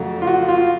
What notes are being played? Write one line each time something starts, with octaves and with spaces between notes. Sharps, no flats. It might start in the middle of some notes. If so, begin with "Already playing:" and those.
Already playing: F2 C#3 F#3 A3
F4
F#4
F4